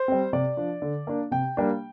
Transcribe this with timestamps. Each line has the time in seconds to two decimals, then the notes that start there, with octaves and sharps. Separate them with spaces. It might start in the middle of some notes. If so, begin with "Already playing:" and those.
Already playing: C5
0.08 G3 C4
0.33 C3 D5
0.57 F3 D4
0.82 D3
1.07 A#3 D4
1.31 C3 G5
1.57 G3 A#3 D4